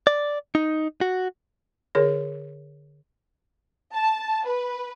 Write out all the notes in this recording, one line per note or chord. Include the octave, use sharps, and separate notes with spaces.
D5
D#4
F#4
D3 G#4 A#4 C#5
A5
B4